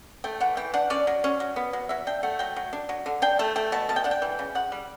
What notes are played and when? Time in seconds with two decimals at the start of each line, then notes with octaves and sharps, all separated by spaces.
0.24 A3 G5
0.40 E3 F#5
0.57 E3 G5
0.74 D4 F#5
0.90 C#4 D5
1.07 F#3
1.24 C#4
1.40 F#3
1.56 B3
1.73 F#3
1.89 F#3 E5
2.07 D4 G5
2.23 A3 F#5
2.39 F#3 G5
2.56 F#3
2.73 D4
2.89 F#3
3.06 D3
3.22 D4 G5
3.39 A3 A5
3.56 A3 G5
3.72 B2 A5
3.89 B2 A5
3.96 G5
4.04 D4 F#5
4.11 G5
4.22 E3
4.39 C#3
4.55 C#3 F#5
4.72 G3